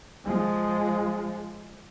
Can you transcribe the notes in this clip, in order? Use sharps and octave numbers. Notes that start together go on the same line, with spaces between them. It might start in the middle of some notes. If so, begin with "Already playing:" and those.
F3 G#3